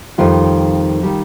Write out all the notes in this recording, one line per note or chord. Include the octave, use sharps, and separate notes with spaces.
F2 D#3 G3 F4
D#3 G3